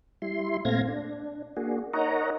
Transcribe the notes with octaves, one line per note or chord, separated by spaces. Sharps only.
G3 E4 C6
A#2 A3 C4 F5 G#6 A#6
D4
A#3 D4 F#4 G#4
D#4 A#4 C#5 D#5 F#5 A#5